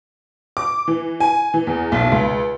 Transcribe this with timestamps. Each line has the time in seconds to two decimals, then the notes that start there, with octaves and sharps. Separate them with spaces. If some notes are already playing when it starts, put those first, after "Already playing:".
0.57 D6
0.88 E3
1.20 G#5
1.54 E3
1.67 E2
1.92 B1
2.12 C#2